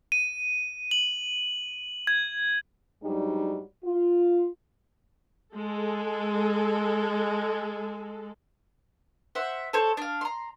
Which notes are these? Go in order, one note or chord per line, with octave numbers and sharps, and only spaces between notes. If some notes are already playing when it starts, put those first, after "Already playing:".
D#7
F#7
G#6
G#2 F#3 G3 D4 D#4
F4
G#3 A4
C5 E5 F#5
A4 C5 C#5
D4 F5
A#5 C6